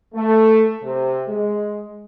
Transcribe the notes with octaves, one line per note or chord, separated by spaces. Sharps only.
A3
C3
G#3